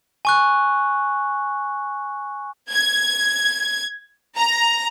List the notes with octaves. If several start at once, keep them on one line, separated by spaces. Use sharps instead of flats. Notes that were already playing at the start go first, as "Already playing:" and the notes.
G#5 C#6 F#6
G#6
A#5